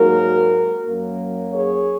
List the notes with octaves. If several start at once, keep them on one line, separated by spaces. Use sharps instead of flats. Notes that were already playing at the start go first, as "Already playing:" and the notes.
Already playing: G#2 F#3 A#3 F#4 A#4
F#2 F#3 A#3
G#4 C#5